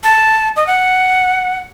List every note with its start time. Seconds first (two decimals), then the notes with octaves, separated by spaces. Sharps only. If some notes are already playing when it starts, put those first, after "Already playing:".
0.04 A5
0.56 D#5
0.67 F#5